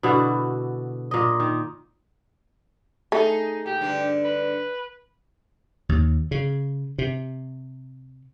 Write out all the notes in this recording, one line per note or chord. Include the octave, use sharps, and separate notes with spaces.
B2 D3 E4 F#4
A#2 D#5
D#3
A3 D#4 G#4
A#2 G4
G2 D3 D4
B4
D#2
C#3
C3